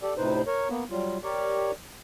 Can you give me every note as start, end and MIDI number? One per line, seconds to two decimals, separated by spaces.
0.02 0.14 67
0.02 0.14 69
0.02 0.14 74
0.17 0.41 38
0.17 0.41 45
0.17 0.41 48
0.17 0.41 63
0.17 0.41 71
0.17 0.41 72
0.47 0.68 70
0.47 0.68 73
0.70 0.84 58
0.70 0.84 59
0.91 1.17 54
0.91 1.17 55
0.91 1.17 65
1.23 1.71 67
1.23 1.71 70
1.23 1.71 73
1.23 1.71 74